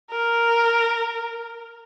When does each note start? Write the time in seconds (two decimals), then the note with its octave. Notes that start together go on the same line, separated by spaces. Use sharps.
0.11 A#4